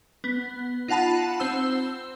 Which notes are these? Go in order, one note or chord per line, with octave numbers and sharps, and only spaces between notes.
B3
D#4 F4 F#5 A5 B5
C4 C5 E6